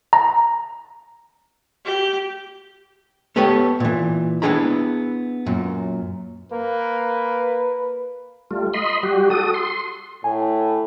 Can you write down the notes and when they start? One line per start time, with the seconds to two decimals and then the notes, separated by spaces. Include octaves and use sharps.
0.13 A#5
1.85 G4
3.36 B3 G4 A4 B4 C#5
3.80 A#2 E3
4.42 B3 D4 E4 G#4 A#5 B5
5.46 F#2 A#2
6.52 A#3 B4
8.51 G3 A3 F4
8.74 D#5 B5 C6
9.03 G3 F#4 G4
9.30 F#4 A4 D#6
9.54 C6
10.24 A2 G#5